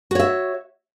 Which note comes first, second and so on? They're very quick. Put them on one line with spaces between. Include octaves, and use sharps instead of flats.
F#4 C#5 E5